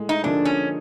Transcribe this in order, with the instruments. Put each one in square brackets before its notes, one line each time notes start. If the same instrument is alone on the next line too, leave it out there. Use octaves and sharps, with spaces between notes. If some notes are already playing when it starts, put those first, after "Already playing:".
Already playing: [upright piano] A2 G#3
[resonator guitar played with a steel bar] D#4
[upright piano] D3 F3 A#3 D#4 G#4 [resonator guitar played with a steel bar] D4
[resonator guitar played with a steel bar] C#4